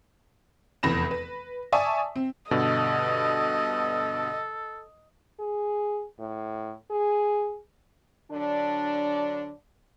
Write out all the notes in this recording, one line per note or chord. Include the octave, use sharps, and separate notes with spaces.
F1 E2 B5 A#6 E7
B4
D5 E5 G#5 A5 C#6 D#6
C4
G2 B2 D3 A4 D#5
G#4
A2
G#4
D3 F#3 D4